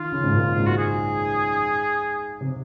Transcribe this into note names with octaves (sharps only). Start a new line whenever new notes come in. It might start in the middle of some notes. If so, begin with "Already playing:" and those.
Already playing: D#3 F4
C#3
G#2
A#2
G#2
F#4
G#4
C3